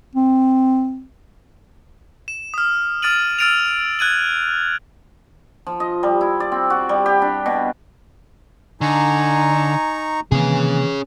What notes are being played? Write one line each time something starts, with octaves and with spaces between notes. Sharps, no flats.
C4
E7
D#6 F6
D#6 F6 A6 D7 D#7 F#7
E6 F6 A6 D7 D#7 F7
F#6 G#6 D#7 F#7
F3
D#5
G3
E4
D5
C4
F#4
G3
G4
D4
B2
D3 D#4 G#5 A#5 C#6
C3 D#3 E3 A#3 C#4 G#4